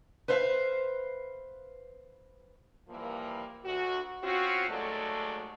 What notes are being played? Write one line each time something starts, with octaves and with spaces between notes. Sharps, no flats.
B4 C5 E5 F5
E3 F3 G3 A#3
D2 F#4
C4 C#4 F4 F#4
D#2 F#3 G#3 A3 A4 D5